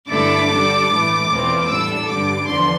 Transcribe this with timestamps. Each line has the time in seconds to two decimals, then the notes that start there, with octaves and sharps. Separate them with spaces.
0.09 G2 D3 A3 E4 A4 D6
0.49 D3 G3 D4 A4
0.89 A2 E3 A3
1.29 E2 B2 A3 C4 F4
1.68 A2 G3 D4 A4 E6
2.07 G2 D3 G3 D6
2.47 E2 D3 F3 C6